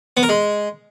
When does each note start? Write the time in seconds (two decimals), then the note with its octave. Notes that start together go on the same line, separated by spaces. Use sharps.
0.17 B3
0.23 A#4
0.29 G#3